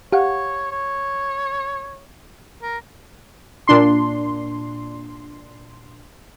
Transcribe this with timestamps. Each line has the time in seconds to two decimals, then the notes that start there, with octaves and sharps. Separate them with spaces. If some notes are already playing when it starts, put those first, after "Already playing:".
0.13 G4 C#5 F5 F#5
0.71 C#5
2.62 A#4
3.68 A#2 D4 C6